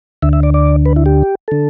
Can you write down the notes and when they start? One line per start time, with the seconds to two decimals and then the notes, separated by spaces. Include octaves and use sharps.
0.22 D2 D3 E5
0.33 E5
0.43 D5
0.54 D5
0.86 B4
0.96 E4
1.06 G4
1.48 D3 A4